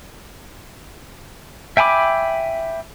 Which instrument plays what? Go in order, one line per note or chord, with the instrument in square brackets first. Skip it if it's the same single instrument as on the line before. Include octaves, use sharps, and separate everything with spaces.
[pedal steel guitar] E5 G5 G#5 B5 D6